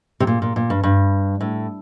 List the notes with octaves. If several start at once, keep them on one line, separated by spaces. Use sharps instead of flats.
C3
A#2
A#2
A#2
G2
G2
A2